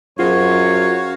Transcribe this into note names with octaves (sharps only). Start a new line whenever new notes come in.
F#2 F4 F#4 G#4 C5 C#5 F5